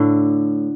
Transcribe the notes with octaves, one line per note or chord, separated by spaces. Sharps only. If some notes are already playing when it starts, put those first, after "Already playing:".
Already playing: A2 D3